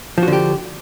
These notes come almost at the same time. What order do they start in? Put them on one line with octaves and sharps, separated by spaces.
F3 F#4 D3 G4